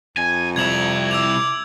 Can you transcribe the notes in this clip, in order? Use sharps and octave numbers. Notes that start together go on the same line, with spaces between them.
F2 G#5
C2 E4 G#6 F7 F#7
D6 E6 G#6 F7